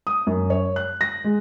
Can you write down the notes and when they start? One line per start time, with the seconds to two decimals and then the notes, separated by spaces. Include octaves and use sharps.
0.07 D#6
0.27 F#2
0.50 C#5
0.76 F#6
1.01 A#6
1.24 G#3